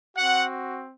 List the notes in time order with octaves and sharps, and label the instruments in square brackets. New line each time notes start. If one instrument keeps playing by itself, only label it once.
[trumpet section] C4 F#4 F#5